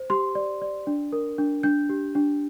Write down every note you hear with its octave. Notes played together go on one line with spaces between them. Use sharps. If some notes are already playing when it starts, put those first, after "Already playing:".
Already playing: C5
G4 C6
D5
D5
D4
A#4
D4
D4 G6
G4
D4